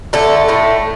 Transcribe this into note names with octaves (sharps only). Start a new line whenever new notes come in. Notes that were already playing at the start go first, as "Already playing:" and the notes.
D3 A3 A4
A2 A3